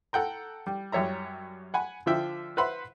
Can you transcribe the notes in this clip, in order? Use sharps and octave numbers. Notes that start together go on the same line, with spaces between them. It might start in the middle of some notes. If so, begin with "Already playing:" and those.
A4 F#5 G5 A#5
G3
F#2 G3 C#5 E5 A#5
F#5 G#5 B5
D3 F3 E5 G5
B4 C5 E5 F#5 B5 C6